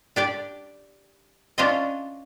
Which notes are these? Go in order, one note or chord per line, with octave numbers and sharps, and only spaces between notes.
D4 G4 D5
C#4 D4 F4 C5 C#5 D#5